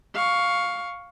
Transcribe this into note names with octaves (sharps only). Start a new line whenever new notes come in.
F5 C#6